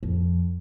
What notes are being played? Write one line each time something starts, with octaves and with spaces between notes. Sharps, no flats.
F2